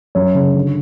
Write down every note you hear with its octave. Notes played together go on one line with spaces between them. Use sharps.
F#2 C#5
C#3
D3